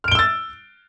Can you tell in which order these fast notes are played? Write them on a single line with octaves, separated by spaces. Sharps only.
F6 D7 G7 E6 A6